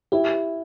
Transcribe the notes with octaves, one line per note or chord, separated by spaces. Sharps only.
E4 G4